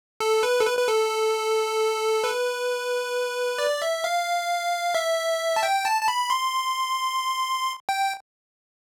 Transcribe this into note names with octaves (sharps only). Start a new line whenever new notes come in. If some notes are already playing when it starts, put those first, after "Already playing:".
A4
B4
A4
B4
B4
A4
B4
D5
E5
F5
E5
A5
G5
A5
A5
B5
C6
G5